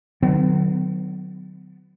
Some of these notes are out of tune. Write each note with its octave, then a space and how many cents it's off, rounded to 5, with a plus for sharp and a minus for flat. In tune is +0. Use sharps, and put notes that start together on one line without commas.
D#3 -45 F#3 +0 B3 +30